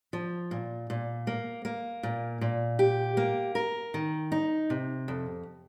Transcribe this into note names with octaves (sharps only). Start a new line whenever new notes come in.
F3
A#2
A#2
A#3
A#3
A#2
A#2
G4
A#3
A#4
D#3
D#4
C3
F2